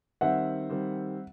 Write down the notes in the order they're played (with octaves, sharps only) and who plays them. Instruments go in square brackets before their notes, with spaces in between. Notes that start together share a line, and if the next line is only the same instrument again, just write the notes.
[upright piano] D#3 G3 C4 [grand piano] E5 F#5
[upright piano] D#3 G3 C4